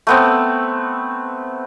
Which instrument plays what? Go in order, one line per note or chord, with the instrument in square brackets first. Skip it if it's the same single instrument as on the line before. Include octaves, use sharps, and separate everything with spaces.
[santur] A3 B3 C4